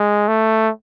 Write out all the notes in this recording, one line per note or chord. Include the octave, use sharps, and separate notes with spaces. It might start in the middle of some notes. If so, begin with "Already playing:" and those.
Already playing: G#3
A3